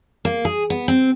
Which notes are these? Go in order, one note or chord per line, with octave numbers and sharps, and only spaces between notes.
A#3
G#4
B3
C4